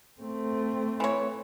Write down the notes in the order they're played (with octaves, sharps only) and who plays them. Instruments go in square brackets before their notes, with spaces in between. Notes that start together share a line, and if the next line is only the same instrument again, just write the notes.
[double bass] A3 C4
[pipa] E3 C#5